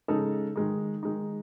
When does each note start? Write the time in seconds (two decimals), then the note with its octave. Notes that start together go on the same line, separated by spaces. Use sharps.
0.08 C#3 G#3 D#4 A4
0.56 D#3 G#3 D#4
1.03 D#3 G#3 D#4